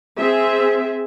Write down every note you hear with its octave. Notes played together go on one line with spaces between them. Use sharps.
C4 G#4 E5